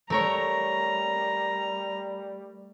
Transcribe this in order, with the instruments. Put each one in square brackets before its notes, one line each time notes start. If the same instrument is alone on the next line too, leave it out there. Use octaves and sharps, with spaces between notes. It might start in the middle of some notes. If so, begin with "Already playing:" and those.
[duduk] G3 [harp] A3 A#4 C#5 [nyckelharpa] A#5